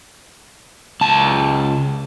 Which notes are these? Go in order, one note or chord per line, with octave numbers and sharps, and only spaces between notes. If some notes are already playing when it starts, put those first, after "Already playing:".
C#2 A5